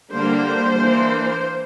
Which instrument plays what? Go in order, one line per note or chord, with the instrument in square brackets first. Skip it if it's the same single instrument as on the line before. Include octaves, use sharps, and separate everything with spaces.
[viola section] D3 G3 A#3 D4 C5
E3 A#3 D4